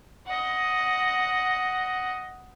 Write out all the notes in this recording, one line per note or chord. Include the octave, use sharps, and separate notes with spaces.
D#5 F#5